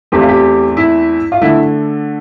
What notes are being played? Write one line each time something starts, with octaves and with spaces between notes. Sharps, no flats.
E2 E3 A3 C4 G4
F4
G4
E4
F4
D3 A3 E4